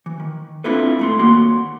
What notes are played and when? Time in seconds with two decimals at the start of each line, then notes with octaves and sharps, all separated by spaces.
0.06 E3
0.20 D#3
0.64 C4 D4 E4 F4 A4 B4
0.99 G2 A3 C6
1.19 D#2 A#3 F#4 C6